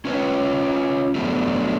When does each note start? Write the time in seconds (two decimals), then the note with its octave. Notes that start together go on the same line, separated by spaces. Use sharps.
0.05 C#4 F4 B4 C#5
1.15 F#3 A3 B3 D4 G4